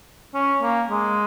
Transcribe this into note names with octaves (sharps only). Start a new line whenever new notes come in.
C#4
A#3
G#3